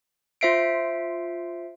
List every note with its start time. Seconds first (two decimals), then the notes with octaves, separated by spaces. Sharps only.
0.41 F4 C5 E5 C7 D7